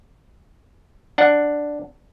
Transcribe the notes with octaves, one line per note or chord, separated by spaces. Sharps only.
D4 F#5